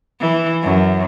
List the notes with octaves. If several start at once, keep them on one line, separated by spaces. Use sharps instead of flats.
E3
F#2